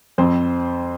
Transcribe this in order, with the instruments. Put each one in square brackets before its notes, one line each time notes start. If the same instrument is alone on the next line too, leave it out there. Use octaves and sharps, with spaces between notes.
[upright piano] F2 C4 C5